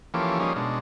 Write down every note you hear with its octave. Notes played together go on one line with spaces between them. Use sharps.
E3 F3 A#3 C#4 G4 A4
F3 G3 A#3 C#4 D#4 G#4
B2 G#3 D4